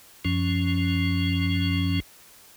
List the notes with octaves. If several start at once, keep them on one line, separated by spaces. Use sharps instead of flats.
F#2 F3 C#4